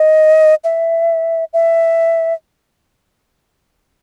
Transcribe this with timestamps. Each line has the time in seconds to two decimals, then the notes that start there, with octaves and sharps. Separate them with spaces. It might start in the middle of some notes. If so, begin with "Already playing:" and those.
Already playing: D#5
0.64 E5
1.53 E5